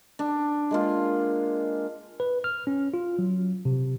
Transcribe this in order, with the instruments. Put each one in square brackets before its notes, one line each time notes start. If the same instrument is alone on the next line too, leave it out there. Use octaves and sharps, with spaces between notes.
[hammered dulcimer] D4
G#3 A#3 F4
[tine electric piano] B4
F6
C#4
F4
F#3
C3